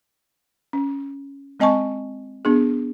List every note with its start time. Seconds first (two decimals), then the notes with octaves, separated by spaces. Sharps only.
0.73 C#4
1.60 G#3 C4 D#5 G#5 A5 C#6
2.45 B3 D4 G#4